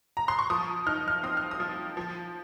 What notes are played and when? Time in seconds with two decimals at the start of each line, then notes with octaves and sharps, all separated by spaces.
0.17 A#5
0.28 C6
0.39 C#6
0.50 F3 D#6
0.86 D#4 F6
1.08 F6
1.23 C4 D#6
1.37 F6
1.51 D#6
1.60 F3
1.97 F3